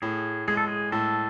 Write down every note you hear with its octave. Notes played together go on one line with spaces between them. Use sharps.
A2 G#4
G#3 G#4
A4
G#4
A2 A4